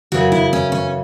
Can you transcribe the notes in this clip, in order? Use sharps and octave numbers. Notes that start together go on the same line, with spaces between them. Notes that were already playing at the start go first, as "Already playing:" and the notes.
F#2 C#3 E3 F#4
E4
C#4
C#4